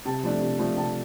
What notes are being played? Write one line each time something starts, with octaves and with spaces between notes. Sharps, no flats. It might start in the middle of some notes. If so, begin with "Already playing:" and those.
C3 A5
F3 A3 D4
C3
F3 A3 D4
C3 A5